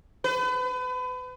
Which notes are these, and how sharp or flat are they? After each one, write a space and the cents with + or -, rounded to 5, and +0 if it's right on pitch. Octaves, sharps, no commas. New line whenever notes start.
B4 +35